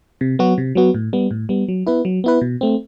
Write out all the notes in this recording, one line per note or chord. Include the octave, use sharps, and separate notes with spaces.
C3
F#3 B3 F#4
C3
F#3 B3 F#4
A2
G3 B3
A2
G3 B3
F#3
B3 E4 B4
F#3
B3 E4 B4
B2
A3 C4